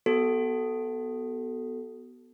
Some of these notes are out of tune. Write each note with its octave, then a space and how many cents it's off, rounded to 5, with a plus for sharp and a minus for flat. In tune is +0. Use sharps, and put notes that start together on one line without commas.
B3 +0 F#4 +40 A4 +0